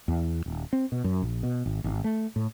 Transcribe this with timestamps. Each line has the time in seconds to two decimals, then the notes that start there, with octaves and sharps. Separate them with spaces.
0.08 E2
0.46 D#1
0.73 C4
0.92 B2
1.04 F#2
1.22 A#1
1.43 B2
1.66 G#1
1.84 G#1
2.04 A3
2.36 A2